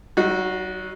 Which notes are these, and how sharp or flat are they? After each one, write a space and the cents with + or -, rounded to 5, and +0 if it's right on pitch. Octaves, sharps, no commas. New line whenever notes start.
F#3 +45 D#4 +5 F#4 -15